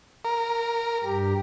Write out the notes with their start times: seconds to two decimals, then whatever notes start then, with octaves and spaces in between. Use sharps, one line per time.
0.25 A#4
1.03 G2 G4